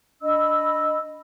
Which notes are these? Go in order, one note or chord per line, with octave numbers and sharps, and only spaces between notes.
D4 D#5 B5 E6